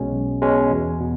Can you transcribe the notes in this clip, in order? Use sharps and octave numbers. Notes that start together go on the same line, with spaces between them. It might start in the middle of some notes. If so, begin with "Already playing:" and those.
Already playing: B1 B2 G#3 C#4
B1
B2 G#3 C#4
E2
B2